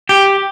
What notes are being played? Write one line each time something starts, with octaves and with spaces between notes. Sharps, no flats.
G4